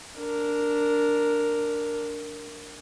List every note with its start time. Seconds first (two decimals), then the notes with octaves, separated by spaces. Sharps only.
0.19 D4 A#4